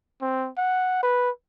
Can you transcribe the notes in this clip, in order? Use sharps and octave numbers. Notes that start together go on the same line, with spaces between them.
C4
F#5
B4